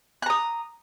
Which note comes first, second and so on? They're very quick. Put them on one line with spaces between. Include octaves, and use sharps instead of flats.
F#6 A#5 D#6